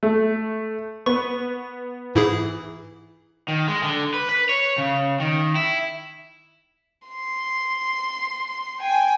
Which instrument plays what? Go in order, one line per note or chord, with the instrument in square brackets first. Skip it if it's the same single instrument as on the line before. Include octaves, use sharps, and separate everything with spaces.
[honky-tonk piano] A3
[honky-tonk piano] B3 B4 [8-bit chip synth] C#6
[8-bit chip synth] G#2 E4 G#4 [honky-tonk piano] E3
[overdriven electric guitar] D#3
G#3
D3
B4
B4
C#5
C#3
D#3
E4
[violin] C6
G5 G#5